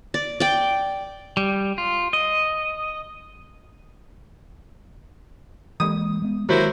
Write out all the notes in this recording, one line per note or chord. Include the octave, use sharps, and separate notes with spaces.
D5
D5 G5
G3
F4
D#5
E3 G#3 A#3 D#6
G#3 B3
D#3 F#3 G#3 A#3 E4 C5